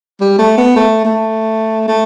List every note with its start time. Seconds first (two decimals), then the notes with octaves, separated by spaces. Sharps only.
0.21 G3
0.39 A3
0.57 B3
0.76 A3
1.05 A3
1.88 A3